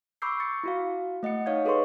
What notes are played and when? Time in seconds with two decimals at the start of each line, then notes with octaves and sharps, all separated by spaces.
0.22 B5 C#6 D6 E6 G6 C7
0.40 C#6 A6 C#7
0.64 E4 F#4 F5
1.23 A3 D#5 F#5 C#7
1.46 D#4 C#5 F5 G#6
1.65 G#4 A4 B4 D#5 C6 C#6